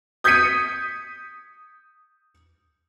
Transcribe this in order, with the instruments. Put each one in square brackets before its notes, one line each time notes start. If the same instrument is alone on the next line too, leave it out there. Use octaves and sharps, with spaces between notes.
[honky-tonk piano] D#6 G6 G#6 B6 C#7 D#7